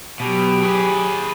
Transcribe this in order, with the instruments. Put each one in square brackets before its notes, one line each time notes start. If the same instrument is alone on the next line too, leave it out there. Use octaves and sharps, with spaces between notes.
[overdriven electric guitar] B2 [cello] F#3 G4
[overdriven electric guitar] G#4 B4